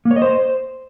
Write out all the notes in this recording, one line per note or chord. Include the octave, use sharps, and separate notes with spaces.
A#3
C#5
D#5
C5